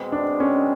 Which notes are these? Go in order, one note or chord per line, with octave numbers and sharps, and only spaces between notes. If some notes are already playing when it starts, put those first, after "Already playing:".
Already playing: B2 G#3 C4
D4
C#4